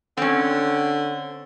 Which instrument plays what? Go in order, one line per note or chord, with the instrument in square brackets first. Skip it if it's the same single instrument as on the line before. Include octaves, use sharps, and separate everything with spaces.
[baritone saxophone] D3 [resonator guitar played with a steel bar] C4 C#4